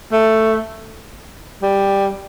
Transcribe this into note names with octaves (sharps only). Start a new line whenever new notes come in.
A3
G3